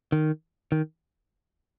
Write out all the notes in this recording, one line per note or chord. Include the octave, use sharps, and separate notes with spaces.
D#3
D#3